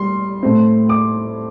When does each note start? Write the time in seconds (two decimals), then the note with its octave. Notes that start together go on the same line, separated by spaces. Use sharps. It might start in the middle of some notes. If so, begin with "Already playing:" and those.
Already playing: G3 C6
0.43 A2 A3 C4
0.89 D6